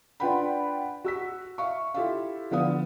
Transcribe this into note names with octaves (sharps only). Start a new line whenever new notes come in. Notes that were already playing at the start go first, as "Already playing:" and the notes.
D4 F4 B4 F#5 G5 B5
F#4 E6 B6
E5 F5 C#6
E4 F4 G4 A4 E5 F5
D3 F3 B3 F5 D#6